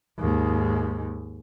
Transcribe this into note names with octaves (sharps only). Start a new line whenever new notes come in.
D#2 G#2